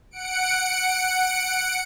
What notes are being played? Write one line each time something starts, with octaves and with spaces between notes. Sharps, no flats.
F#5 C#7 D7